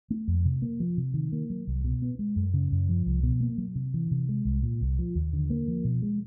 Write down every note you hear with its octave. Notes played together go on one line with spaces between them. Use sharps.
A3
F2
C3
A#3
F3
C3
D#3
A#3
F#3
C2
B2
B3
G#3
F#2
C#3
F#2
F3
C2
B2
A#3
F#3
C3
E3
C3
G#3
C2
A#2
C2
F3
D#2
D3
A#3
F3
B2
G#3